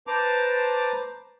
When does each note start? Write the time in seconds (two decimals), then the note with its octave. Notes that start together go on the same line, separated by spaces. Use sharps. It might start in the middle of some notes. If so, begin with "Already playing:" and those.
0.07 B4 C5 A5 A#5 D6